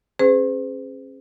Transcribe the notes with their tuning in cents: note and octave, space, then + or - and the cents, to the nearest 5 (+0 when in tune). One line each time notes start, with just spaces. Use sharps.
C#4 -40 G#4 +0 C5 -45